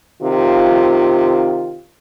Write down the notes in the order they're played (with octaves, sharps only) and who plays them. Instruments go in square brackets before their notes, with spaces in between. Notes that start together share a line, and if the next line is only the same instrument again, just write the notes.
[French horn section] C3 D#3 F4